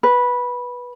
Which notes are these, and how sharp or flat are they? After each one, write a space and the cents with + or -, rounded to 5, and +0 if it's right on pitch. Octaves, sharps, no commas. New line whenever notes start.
B4 -10